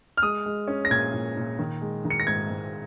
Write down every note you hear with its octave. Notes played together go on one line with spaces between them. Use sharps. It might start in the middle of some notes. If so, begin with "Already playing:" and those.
F6
G#3 D#6
G#3
C#4
A#6
A#2 G#6
A#2
A#2
D#3
G#3
D#3
C#7
A#6
G#2 G#6
G#2